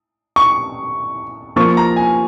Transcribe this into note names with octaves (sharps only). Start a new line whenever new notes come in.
C#6
F3 A#3 F4 C#6
A#5
G#5